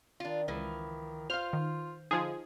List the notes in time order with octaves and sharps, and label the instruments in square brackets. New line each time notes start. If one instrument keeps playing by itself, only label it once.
[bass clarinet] D#3 [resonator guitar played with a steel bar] D4 F4
[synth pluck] C#2 [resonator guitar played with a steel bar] E3 F3
[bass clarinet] F4 [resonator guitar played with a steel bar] C5 F5 [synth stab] F6
[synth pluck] D#3
[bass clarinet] D3 [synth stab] F3 G#4 [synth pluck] D#4 F4